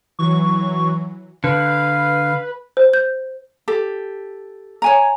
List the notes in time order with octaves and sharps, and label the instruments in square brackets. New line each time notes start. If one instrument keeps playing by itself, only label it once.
[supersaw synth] E3 F#3 [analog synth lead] C#6
[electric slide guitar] D3 [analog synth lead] B4 [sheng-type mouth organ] F5
[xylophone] C5
G6
[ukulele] G4 A4
C#5 G#5 A#5